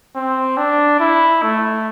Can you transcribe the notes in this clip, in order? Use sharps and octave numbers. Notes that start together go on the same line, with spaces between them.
C4
D4
E4
A3